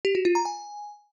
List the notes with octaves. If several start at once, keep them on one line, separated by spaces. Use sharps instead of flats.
G4
F#4
F4
A#5
G#5